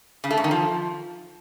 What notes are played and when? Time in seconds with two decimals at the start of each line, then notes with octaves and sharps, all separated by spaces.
0.24 C#3
0.31 A3
0.37 F#2
0.44 D#3
0.51 F3